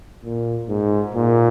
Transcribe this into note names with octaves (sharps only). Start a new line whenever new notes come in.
A#2
G#2
A#2